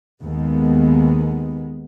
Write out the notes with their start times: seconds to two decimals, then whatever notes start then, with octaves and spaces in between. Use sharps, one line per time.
0.21 D#2 G#3 B3